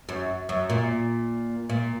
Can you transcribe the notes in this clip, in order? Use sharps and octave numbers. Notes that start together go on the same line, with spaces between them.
F#2
F#2
A#2
A#2